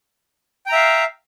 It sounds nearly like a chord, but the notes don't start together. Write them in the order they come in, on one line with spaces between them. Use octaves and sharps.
G5 A#5 E5 F5